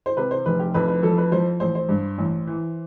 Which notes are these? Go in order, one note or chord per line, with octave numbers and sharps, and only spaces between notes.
C5
C3 B4
C5
F1 B4
G4
F2 B4
B4
F3 A4
B4
F3 C5
A1 C5
C5
G2
A1
E3